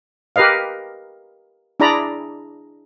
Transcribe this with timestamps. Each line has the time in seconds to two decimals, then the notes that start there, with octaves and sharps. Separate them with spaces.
0.36 G4 A#4 B4 D#5 F5
1.80 D4 E4 G#4 D5 A#5 B5